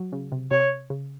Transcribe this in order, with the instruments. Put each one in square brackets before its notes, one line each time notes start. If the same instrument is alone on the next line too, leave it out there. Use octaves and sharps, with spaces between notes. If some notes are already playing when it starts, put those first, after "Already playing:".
Already playing: [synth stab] F#3
C#3
C3
[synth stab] C3 [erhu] C#5
[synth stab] C#3